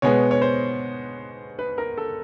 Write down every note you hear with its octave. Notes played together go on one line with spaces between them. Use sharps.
B2 G#3 B3 C#5
C#5
C5
B4
A#4
A4